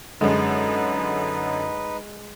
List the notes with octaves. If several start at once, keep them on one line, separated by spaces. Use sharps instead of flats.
F#2 D3 G#3 D#4 B4